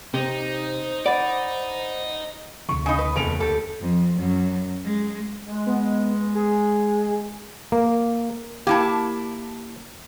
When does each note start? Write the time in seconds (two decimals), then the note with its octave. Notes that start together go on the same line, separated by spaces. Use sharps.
0.14 C3 D#4 C5
1.06 D5 F#5 B5 A6
2.69 D2 C3 E3 C#6
2.86 C#3 D#4 G#5 B5
2.99 B4
3.16 F#1 E2 C3 E3 C#4 A4 D7 F7
3.40 D2 G4 A4
3.81 F2
4.19 F#2
4.85 G#3
5.48 G#3
5.66 B3
6.35 G#4
7.72 A#3
8.67 A#3 E4 G4 A5